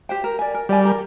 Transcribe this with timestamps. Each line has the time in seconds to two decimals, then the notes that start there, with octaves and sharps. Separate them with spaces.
0.09 G4 C5 G5
0.24 A#4
0.39 D5 G#5
0.54 A#4
0.69 G3 D5 G#5
0.85 A#4